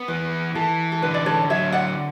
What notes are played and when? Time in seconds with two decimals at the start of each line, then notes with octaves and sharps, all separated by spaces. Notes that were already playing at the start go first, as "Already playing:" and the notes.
Already playing: B3
0.08 E3 B4
0.55 E3 A4
0.92 A4
1.02 D3 B4
1.14 D5
1.26 A4 C#5
1.50 F#3 C#5 E5
1.72 D5 F#5